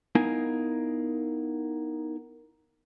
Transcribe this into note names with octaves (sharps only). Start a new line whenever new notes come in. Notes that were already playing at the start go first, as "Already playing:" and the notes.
B3 D#4 E4 A#4 F5 G#5